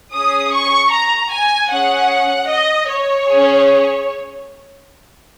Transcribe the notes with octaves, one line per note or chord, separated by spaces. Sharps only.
C#4 G#4 D#6
C#6
A#5
G#5
C#4 G#4 F#5
D#5
C#5
C#4 G#4